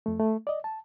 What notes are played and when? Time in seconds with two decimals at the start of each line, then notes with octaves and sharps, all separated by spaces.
0.06 F2 A3
0.20 A3
0.47 D5 D#5
0.64 A5